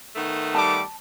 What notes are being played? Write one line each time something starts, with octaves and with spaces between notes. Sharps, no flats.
D#3 A3 B3
G3 G4 A5 D6